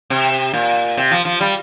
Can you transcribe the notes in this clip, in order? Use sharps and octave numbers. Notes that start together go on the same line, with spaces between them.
C3
A#2
C3
F3
F3
G3